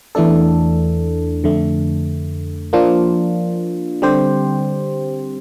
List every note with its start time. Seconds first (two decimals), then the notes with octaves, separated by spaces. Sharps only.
0.15 E2 E3 A3 D4 A4
1.44 F2 D3 A3
2.73 F3 A#3 D4 F4
4.02 D3 G3 C4 G4 C5